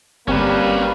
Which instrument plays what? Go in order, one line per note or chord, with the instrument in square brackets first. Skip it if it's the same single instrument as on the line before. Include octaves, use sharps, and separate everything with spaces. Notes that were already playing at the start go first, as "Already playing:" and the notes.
[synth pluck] G1 C4 E7 [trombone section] G3 A#3 [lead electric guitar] C#4 B4